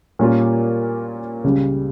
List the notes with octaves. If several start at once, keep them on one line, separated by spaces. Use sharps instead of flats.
A#2 G3 A#3 C#4 F4
C#2 C#3 G3